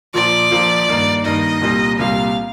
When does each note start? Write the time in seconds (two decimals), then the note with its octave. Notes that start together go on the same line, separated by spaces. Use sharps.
0.14 A#1 A#2 F3 A#3 F4 D5
0.51 A#1 A#2 F3 A#3 F4
0.88 G2 D#3 A#3 D#4
1.25 G2 D#3 A#3 D#4 D#5
1.62 C2 A#2 G3 A#3
1.99 C2 A#2 G3 A#3 F5